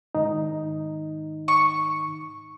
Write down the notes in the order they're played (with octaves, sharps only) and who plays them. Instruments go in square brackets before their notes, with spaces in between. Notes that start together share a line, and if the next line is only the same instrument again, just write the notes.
[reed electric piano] G#2 D#3 D#4
[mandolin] C#6